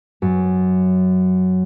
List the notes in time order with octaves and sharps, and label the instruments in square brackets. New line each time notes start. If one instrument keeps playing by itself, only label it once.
[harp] F#2